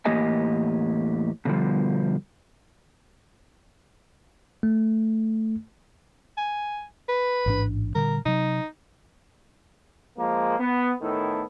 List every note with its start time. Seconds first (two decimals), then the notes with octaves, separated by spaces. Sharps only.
0.05 E2 A2 A#3 G4 D#5 G#5
1.45 B2 D3 D#3 F3 G3
4.63 A3
6.38 G#5
7.09 B4
7.46 A1 G#2 D4
7.95 A#2 D3 G3 A#4
8.26 C3 F#3 D#4
10.18 F3 G#3 A#3
10.60 B3
11.01 A2 D#3 B3 E4 A4